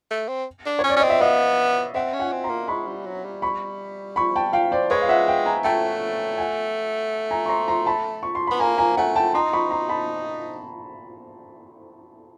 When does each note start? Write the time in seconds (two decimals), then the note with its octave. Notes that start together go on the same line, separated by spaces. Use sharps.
0.11 A3
0.28 C4
0.66 D4
0.79 C#5
0.84 C#4
0.89 D5
0.96 C#4
1.00 C4 D#5
1.10 E5
1.20 B3 D#5 F5
1.94 C4 E5 F#5
2.14 C#4
2.19 F#5 G#5
2.32 C4
2.44 A#5 C6
2.50 A#3
2.68 G#3 B5 C#6
2.88 G3
3.06 F#3
3.24 G3
3.42 B5 C#6
4.16 B5 C#6
4.36 G5 A5
4.53 F5 G5
4.72 C5 D5
4.90 G#3 B4 C#5
5.02 F5
5.09 E5 F#5
5.27 F5 G5
5.46 G#5 A#5
5.64 A3 G5 A5
6.38 F#5 G#5
7.31 G#5 A#5
7.46 C#6
7.49 A#5 C6
7.68 A#5 C6
7.86 A5 B5
8.23 C#6
8.35 C6
8.47 B3 B5
8.60 A#3 G#5 A#5
8.78 G#5 A#5
8.97 A3 F#5 G#5
9.16 G5 A5
9.34 D#4 A#5 C6
9.53 B5 C#6
9.71 A#5 C6
9.89 A5 B5